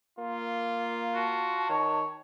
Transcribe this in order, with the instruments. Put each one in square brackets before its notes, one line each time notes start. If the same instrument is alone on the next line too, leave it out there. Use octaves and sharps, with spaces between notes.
[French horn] A#3 [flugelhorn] F4
[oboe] F#4 [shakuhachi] A5
[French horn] D#3 [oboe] C#5